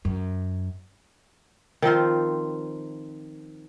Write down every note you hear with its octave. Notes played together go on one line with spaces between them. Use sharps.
F#2
D#3 F3 C4 F4